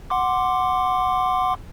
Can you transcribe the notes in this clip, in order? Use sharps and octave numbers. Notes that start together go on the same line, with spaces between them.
F#5 C6 D6